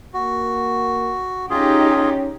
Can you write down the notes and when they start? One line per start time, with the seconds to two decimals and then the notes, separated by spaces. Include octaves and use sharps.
0.14 A#3 F#4
1.50 C#4 D#4 F4 G4 G#4